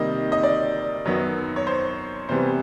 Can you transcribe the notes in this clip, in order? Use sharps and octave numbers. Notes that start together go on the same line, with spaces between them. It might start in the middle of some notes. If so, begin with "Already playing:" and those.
Already playing: C3 D#3 G3 A#3 D#5
D#5
D5
F#2 D#3 F#3 B3
C#5
C5
C3 E3 G3 B3 C5